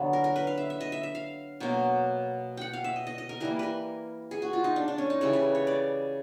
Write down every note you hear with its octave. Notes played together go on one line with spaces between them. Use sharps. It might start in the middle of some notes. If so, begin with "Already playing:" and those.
Already playing: D3 F#3 B3
A#4
A#4
B4
F5
E5
E5
D#5
E5
E5
F5
B2 F#3 A#3
F#5 G5
F5
E5
D#5
D#5
D#5
A#4
E3 G3 A#3 A#4
A#4 B4
G#4
F#4
F4
D#4
D4
D4
C#4
D#4
C#3 E3 G3 A4
B4
C#5
D5